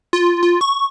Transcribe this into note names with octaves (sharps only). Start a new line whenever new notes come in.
F4
F4
C#6